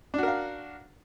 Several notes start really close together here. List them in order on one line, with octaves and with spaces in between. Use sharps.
D4 F#4 A#4 F5